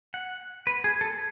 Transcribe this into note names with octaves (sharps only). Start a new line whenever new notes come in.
F#5
B4
G#4
A4